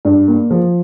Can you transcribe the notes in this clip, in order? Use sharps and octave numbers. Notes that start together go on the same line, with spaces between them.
G2
A#3
F3